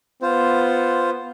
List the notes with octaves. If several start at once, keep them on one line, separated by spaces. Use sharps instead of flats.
B3 F4 C5